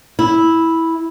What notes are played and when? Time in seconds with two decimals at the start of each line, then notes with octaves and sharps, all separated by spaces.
0.19 E4